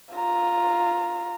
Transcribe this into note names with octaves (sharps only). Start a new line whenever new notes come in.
F4 A#5